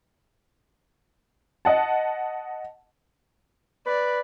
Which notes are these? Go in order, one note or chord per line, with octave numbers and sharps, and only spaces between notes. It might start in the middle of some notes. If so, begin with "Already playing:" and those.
D#5 F#5 A5
B4 D5